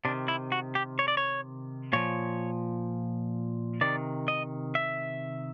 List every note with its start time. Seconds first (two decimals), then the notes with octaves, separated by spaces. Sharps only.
0.05 C3 D4
0.08 D#3
0.28 E4
0.52 F#4
0.75 G4
0.99 C#5
1.08 D5
1.17 C#5
1.93 A#2 F3 C#5
3.81 C3 D#3 D5
4.28 D#5
4.75 E5